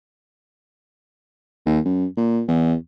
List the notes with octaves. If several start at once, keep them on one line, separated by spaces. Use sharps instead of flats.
D#2
F#2
A#2
E2